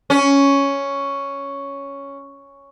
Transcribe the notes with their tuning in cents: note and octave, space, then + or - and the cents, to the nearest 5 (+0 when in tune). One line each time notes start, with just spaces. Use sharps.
C#4 +5